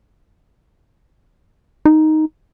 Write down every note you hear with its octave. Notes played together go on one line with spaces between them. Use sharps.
D#4